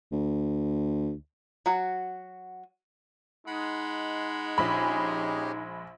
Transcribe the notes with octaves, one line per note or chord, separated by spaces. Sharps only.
D2
F#3 F#4
G#3 D#4 F#5 B5
A#1 C#4 G4 G#4 B5